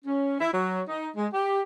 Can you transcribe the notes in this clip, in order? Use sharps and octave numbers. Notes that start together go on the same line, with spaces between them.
C#4
E4
F#3
D#4
G#3
G4